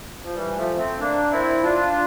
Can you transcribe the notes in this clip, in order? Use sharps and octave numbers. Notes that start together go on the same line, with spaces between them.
F3
E3 G3
F3 A3
A3 C4
A#3 D4
C4 E4
D4 F4